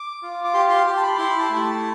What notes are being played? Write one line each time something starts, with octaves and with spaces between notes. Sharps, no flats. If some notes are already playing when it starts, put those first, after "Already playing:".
Already playing: D6
F4
D6
G4 C6
C6
G4 C6
A5
B5
E4 C6
B5
A5
A3
B5
A5